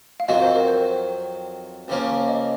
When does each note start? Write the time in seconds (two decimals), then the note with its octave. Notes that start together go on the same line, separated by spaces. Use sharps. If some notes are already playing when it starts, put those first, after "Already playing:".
0.20 F5
0.28 F2 D#3 F#3 C4 F#4 D#5
0.42 C5
0.56 A#4
0.68 C5
1.88 C#2 C#3 F3 A#3 C#4
2.28 D#5